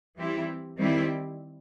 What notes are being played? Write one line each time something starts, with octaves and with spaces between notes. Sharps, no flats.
E3 G3 C4 E4 G4
D#3 G3 C4 E4 G4